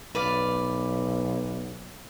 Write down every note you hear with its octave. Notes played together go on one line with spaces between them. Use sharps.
B1 B4 D5 F5